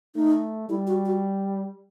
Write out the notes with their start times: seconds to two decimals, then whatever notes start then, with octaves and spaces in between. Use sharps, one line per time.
0.15 A3 D#4
0.69 G3 E4
0.87 F#4
1.05 F#4